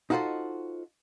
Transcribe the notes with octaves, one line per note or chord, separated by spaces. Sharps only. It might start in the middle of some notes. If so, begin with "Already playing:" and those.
D#4 F4 F#4 A4 C5 D#5